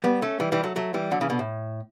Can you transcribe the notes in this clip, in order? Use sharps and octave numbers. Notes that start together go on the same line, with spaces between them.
G3 B3
A3 C#4
E3 G3
E3 G3
F#3 A3
F#3 A3
E3 G3
D3 F#3
C#3 E3
B2 D3
A2